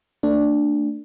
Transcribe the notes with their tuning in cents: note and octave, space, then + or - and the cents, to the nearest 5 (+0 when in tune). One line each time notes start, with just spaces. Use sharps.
A3 +25 D4 +0